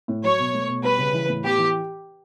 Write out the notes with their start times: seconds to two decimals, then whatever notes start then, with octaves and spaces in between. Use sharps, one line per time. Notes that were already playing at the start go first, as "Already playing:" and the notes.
0.08 A2
0.23 F#3 C#5
0.39 B2
0.54 A3
0.69 B2
0.83 G3 B4
0.99 C#3
1.13 E3
1.29 A2
1.43 B3 G4
1.58 E3